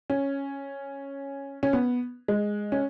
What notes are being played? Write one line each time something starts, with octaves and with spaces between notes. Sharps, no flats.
C#4
C#4
B3
G#3
C#4